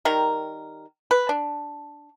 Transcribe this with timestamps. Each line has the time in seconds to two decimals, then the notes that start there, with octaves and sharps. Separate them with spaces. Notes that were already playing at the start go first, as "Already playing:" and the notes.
0.05 D#3 G3 A#4
1.11 B4
1.29 D4